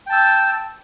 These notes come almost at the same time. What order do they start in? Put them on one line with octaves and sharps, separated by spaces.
G5 A5 E6